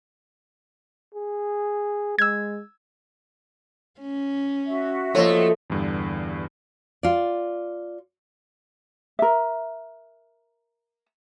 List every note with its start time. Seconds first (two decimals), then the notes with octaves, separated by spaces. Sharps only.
1.15 G#4
2.19 G#3 E6 G#6
4.00 C#4
4.67 F#4 E5
5.15 F3 A3 A#3 C#5 D#5
5.70 E2 G2 D3
7.03 F4 D5
9.19 A#4 E5